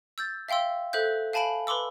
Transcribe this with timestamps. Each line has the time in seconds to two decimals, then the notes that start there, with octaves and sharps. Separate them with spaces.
0.18 E6 G6 A6
0.49 E5 F5 G5 C6 E6
0.93 A4 C5 E5 F#6 G6
1.33 F5 G#5 A5 B5 D7 F#7
1.67 B4 B5 C6 D6 E6